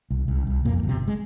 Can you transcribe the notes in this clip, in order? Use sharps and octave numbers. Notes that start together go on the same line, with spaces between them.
C2
C2
C2
F2 A#2 A#3
G1
C3 C4
G#3